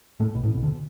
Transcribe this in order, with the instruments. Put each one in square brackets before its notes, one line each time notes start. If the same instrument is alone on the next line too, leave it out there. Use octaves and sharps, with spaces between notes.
[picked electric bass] A2 A3
B1 B2
A1 A2
B1 B2
D2 D3